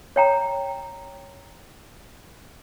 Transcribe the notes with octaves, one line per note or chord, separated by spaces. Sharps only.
C#5 G5 A#5